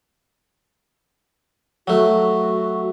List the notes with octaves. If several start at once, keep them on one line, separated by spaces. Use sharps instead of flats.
F#3 A3 F#4